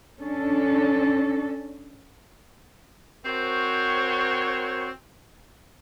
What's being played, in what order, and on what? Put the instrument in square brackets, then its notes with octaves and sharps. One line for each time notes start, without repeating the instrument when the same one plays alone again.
[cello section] C#4 D4 A4
[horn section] C4 F#4 A#4 C5 C#5